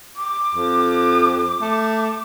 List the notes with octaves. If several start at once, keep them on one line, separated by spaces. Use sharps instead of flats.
D6
F2
A3